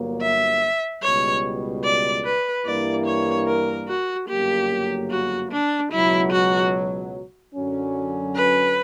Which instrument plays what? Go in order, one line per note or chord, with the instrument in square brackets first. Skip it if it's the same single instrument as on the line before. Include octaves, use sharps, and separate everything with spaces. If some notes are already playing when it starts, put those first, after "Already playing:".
Already playing: [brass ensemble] G1 G2 F#3 A#3
[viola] E5
[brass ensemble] C#2 B2 G3 [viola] C#5
[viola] D5
B4
[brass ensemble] G2 E3 G3 A#3 E4 [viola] D5
[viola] C#5
A#4
F#4
[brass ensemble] G1 F#2 C#3 F#3 A#3 [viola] G4
[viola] F#4
D4
[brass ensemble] C#2 B2 F#3 [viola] E4
[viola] F#4
[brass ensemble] F#2 D3 F#3 C#4
[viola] B4